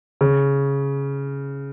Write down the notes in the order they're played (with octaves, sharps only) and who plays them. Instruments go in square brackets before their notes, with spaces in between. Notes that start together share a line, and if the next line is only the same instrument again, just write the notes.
[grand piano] C#3